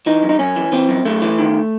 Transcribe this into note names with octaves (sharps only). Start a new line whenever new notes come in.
E3 D#4
F#2
D#4
F#2 C#4
E3
E3 C4
F#2
F#2 A3
E3
D#3